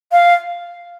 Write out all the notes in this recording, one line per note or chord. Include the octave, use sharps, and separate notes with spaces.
F5